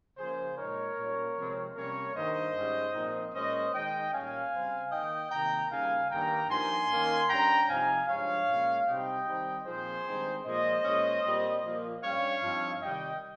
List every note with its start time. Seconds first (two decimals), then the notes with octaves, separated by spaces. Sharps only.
0.18 C#3 F3 A#3 G#4 C5
0.57 A#2 G#3 D#4 A#4 C#5
0.97 A#2 G3 A#3 C#4
1.36 C3 F3 G#3 C4
1.76 C3 G3 A#3 C#4 A#4 C#5
2.16 G2 D#3 A#3 D#4 C5 D#5
2.55 G#2 G3 C#4
2.94 A#2 F3 C4 D#4
3.34 A#2 G#3 C#4 C5 D#5
3.73 D#3 G#3 D#4 D#5 G5
4.13 A#2 G3 C#4 F5 G#5
4.53 C#3 G3 C4
4.92 D#3 A#3 D#4 D#5 G5
5.31 C3 D#3 A#3 G5 A#5
5.70 C#3 G3 A#3 D#4 F5 G#5
6.10 G2 D#3 G3 A#3 G5 A#5
6.50 G2 F3 A#3 D#4 G#5 C6
6.90 D#3 A#3 C#4
7.29 G2 G3 C#4 G5 A#5
7.69 C3 F3 C4 D#4 F5 G#5
8.08 G2 F3 G#3 C#5 F5
8.48 A#2 G#3 C#4
8.87 C3 G3 C4 D#4 D#5 G5
9.27 D#3 G3 C4 D#4
9.66 A#2 F3 C4 D#4 G#4 C5
10.06 G2 D#3 G#3 C4 D#4
10.45 A#2 F3 G#3 C5 D#5
10.84 A#2 G#3 C#4
11.24 A#2 G3 C4
11.64 A#2 F3 A#3
12.03 G2 G3 C#4 C#5 F5
12.43 G2 F3 C4 D#4
12.82 C3 D#3 G3 D#5 G5